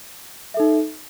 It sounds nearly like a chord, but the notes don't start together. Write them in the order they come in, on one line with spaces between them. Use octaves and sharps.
E5 A4 D#4